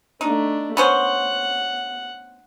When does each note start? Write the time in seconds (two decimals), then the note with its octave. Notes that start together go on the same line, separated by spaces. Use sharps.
0.21 A3 D4 D#4
0.77 B3 C#4 C5 F#5